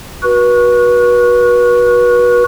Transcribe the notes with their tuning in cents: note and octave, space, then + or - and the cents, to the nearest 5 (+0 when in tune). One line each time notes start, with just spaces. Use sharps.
F#4 +0 B4 -30